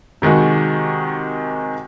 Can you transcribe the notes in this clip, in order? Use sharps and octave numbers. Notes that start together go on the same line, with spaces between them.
C3 D#3 G#3 D#4 F#4